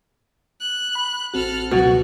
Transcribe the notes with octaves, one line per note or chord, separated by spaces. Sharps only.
F#6
B5
A1 C4 F#4 A4 F6
C#2 B2 F#3 F#4